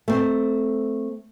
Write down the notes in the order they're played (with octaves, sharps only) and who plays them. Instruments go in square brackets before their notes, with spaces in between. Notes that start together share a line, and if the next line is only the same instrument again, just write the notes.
[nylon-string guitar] A3 C4